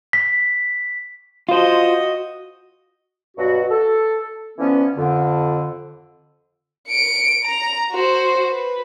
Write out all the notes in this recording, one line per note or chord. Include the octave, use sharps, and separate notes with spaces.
B6
F4 F#4 C5 D#5
G2 B2 F#3 F#4
A4
D3 E3 F3 B3 C#4
F2 D3
C#7 D7
A#5
F#4 C5
B4